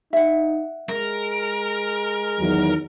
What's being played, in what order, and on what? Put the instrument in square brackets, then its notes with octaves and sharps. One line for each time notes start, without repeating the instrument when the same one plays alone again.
[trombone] D#4 [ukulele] E5 F#5
[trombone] G#3 [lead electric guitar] A#4
[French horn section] E2 D#3 F#3